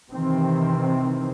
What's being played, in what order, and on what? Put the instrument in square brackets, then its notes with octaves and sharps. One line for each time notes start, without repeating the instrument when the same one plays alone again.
[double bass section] C3 D#3 E3 C4